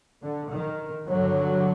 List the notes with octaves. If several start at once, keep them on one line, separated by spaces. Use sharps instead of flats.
D3
D#3
G2 D3 F#3